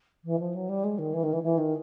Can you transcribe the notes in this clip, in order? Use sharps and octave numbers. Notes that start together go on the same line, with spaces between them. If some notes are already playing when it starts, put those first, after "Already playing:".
E3
F3
F#3
G3
G#3
D#3
E3
D#3
E3
E3
D#3